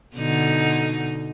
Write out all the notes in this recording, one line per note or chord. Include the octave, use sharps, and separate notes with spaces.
B2 D3 D#4